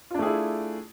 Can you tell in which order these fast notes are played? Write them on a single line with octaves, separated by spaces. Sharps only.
F4 D4 A3 G#4 E4